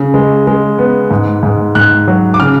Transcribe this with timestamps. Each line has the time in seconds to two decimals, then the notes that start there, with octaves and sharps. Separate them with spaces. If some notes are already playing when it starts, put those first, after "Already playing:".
Already playing: C#3
0.14 G#3
0.47 G#3
0.79 B3
1.11 G#2
1.43 G#2
1.75 G#2 F#6
2.07 F#3
2.34 D6
2.39 C#3 F6